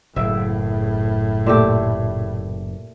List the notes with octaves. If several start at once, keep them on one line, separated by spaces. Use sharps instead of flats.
F#1 A2 E5
A#2 A3 G4